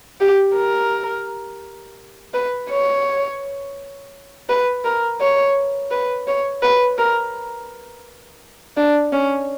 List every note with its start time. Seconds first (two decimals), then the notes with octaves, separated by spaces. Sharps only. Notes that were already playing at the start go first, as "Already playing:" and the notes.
0.20 G4
0.56 A#4
2.34 B4
2.71 C#5
4.49 B4
4.85 A#4
5.21 C#5
5.91 B4
6.27 C#5
6.62 B4
6.98 A#4
8.77 D4
9.13 C#4